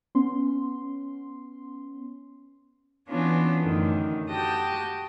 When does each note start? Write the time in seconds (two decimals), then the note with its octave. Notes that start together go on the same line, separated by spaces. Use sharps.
0.15 B3 C#4 C6
3.08 E3 B3 C#4 D4 F4 C#5
3.62 F#2 A2 D3 D#3
4.29 F#4 G4 G5 A5 D#6